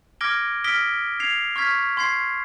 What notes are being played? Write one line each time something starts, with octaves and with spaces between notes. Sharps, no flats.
D6 F6 G#6 A#6 D7 G7
D#6 F6 A#6 B6 D7 G7
G#6 C7 F7
C#6 F6 G#6 B6
C6 G#6 C7